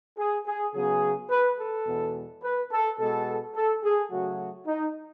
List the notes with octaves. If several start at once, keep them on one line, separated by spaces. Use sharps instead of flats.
G#4
G#4
C#3 F#3 B3 G#4
B4
A4
E2 B2 G#3 B3
B4
A4
B2 G#3 B3 A4
A4
G#4
C#3 F#3 A3 F#4
D#4